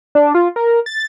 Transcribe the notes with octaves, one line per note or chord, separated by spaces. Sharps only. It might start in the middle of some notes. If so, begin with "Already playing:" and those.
D4
F4
A#4
A6